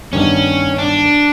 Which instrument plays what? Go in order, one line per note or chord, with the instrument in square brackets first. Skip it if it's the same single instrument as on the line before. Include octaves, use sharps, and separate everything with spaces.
[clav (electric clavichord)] G2 D#3 G3 B3 [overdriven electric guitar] C#4
[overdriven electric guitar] D4